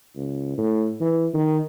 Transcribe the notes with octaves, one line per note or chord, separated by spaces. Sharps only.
C#2
A2
E3
D#3